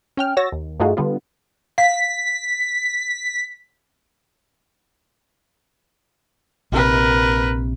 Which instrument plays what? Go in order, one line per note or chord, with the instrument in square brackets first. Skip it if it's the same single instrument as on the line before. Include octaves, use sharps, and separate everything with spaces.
[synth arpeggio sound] C#4 G5 F6
F#4 C#5 E6 A6 A#6
D#2
G2 A3 D#4 F4 F#4 G#4
D3 G3 B3 F4
[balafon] F5 [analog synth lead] B6
[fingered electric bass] A#1 C3 [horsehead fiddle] A#4 B4